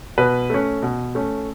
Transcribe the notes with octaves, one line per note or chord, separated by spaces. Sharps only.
B2 B4
A3 C#4
B2
A3 C#4